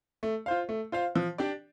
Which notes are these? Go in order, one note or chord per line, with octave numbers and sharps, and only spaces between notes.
A3
F4 C5 F5
A3
F4 C5 F5
F3
D4 G4 D5